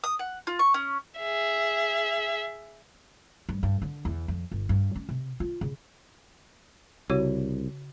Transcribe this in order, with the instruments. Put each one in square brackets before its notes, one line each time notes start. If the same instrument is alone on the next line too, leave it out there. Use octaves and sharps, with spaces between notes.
[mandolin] D#6
F#5
F4
C#6
C#4
[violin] G#4 E5
[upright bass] G2
G2
D3
E2
F2
G1
G2
C#4
C3
F4
C#3
[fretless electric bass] C2 [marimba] C#3 [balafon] F#4 C#5